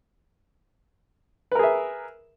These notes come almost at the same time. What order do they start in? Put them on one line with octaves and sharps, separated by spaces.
B4 A#4 G#4 E5